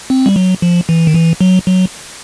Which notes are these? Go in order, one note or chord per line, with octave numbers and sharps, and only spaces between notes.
C4
G3
F#3
F3
E3
D#3
E3
F#3
F#3